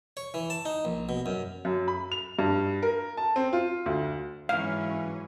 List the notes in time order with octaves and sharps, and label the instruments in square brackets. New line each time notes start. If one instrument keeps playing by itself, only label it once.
[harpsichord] C#5
E3
A5
D#4
A#1
B2
F#2
[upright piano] F#2
B5
F7
G2
A#4
A5
C4
F4
D2
[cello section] G#2 F#3 C#4 [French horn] E3 [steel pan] F5